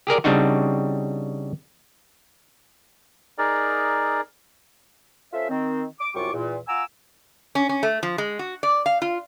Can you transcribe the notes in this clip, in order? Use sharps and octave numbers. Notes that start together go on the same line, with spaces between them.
G4 G#4 A#4 D5
C#3 G3 C4 D4 D#4 F#4
D#4 G#4 A#4 D5
C#4 F4 A4 C5 E5
D#3 C4
D6
C2 F#2 G3 F4 C#6 D6
E2 A#2
F4 F#5 G#5 A#5 D6 E6
C#4
C#4
A3
F3
G#3
F#4
D5
F5
F4